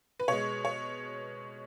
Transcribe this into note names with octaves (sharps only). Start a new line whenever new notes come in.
B4
B2 G#3 C#5
C#5